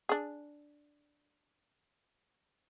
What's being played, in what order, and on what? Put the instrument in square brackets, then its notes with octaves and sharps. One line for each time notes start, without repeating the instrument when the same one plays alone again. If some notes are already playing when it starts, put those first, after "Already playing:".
[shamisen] D4 G#4